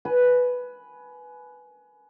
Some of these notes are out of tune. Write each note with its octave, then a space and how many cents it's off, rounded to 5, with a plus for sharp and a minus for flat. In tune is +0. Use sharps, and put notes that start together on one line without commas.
B4 +0 G#5 +25